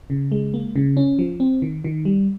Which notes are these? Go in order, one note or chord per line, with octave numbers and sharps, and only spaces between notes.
C#3
G#3
A#3
C#3
C#4
F3
C4
D#3
D#3
G3